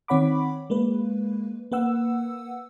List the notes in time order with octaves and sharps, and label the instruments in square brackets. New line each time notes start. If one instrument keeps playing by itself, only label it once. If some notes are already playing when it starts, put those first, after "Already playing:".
[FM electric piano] D#3 C4 C#5 F#5 B5 D6
G#3 A#3 B4
A#3 B4 F#5 E6